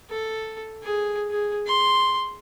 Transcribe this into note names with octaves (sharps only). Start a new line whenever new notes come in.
A4
G#4
G#4
C6